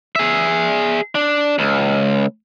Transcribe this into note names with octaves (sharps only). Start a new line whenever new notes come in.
G#4 E5
D4
C#2